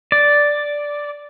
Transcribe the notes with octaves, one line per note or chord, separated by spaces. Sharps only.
D5